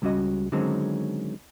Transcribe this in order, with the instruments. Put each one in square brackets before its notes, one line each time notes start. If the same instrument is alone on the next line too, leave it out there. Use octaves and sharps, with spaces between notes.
[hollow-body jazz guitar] C#2 G3 C#4 F#4 D#5
D3 D#3 F#3 G#3 C4 C#4